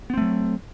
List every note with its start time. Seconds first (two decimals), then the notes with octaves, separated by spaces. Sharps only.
0.10 B3
0.14 C4
0.18 A3
0.21 F#3